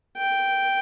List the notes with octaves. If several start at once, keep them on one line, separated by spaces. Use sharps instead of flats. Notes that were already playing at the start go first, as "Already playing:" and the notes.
G5